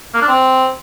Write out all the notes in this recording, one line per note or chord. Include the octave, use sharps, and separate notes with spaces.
A#3
D4
C4